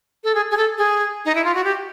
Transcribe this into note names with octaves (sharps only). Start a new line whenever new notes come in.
A4
G#4
G#4
A4
G#4
D#4
E4
F4
F#4
G4